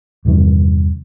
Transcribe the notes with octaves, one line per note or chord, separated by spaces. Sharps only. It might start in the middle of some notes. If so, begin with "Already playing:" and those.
E2 G2 C3 D#3